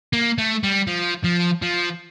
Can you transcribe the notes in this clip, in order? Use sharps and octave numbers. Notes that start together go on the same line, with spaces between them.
A#3
A3
G3
F3
F3
F3